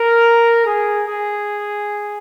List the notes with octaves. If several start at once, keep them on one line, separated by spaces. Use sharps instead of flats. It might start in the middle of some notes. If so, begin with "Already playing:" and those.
Already playing: A#4
G#4
G#4